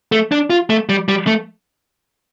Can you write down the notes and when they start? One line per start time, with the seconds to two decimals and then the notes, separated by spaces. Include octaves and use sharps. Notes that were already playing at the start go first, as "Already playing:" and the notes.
0.12 A3
0.32 D4
0.50 F4
0.70 A3
0.89 G3
1.09 G3
1.27 A3